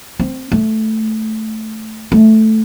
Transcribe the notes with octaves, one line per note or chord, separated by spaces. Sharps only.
C4
A3
A3